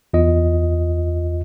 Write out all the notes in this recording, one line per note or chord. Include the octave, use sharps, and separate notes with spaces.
E2 F4 D#5